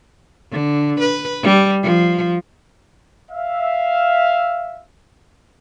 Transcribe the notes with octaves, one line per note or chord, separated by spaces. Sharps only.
D3
B4
G3
F3
E5 F5